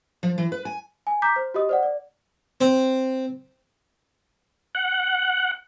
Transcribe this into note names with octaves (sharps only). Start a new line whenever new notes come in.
F3
E3
B4
G#5
G#5
A#5 D6 G6 B6
C5
F#4 G4 D#5 D#6
C5 D5 F#5
D5
C4
F#5